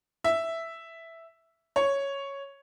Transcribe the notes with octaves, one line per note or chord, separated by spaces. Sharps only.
E5
C#5